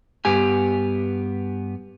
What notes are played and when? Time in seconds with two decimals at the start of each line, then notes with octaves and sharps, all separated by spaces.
0.25 G2 B3 G4 G#5